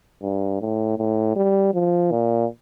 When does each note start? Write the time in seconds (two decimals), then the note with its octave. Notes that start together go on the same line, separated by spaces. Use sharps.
0.22 G2
0.61 A2
0.98 A2
1.36 G3
1.74 F3
2.11 A#2